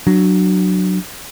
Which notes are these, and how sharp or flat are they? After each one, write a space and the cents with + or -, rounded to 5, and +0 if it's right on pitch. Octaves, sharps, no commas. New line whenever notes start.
F#3 +0 D4 +20